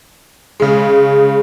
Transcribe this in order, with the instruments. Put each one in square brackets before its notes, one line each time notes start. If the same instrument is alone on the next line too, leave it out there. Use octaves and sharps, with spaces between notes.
[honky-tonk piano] C#3 G#3